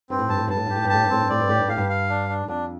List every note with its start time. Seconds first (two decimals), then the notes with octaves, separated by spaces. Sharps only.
0.10 G2 C4
0.19 A2
0.29 G2 A5
0.37 A2
0.48 G2 A5
0.56 A2
0.66 G2 G4
0.75 A2
0.84 G2
0.90 A2 A5
1.03 G2
1.10 A2 C4
1.21 G2
1.29 A2 D5
1.40 G2
1.49 A2 G4
1.59 G2
1.68 A2 F5
1.77 G2
1.89 F5
2.09 D4
2.29 D4
2.48 F2 D4